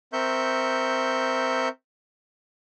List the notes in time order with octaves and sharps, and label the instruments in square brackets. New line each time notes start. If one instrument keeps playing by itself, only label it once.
[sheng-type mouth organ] C4 A#4 E5 C#6 G6